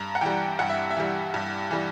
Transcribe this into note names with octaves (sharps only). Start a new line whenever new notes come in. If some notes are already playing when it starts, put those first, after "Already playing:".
Already playing: G2 A#5
F#5
E3 G3 G5
G2 F#5
E5
E5
E3 G3
G2
E3 G3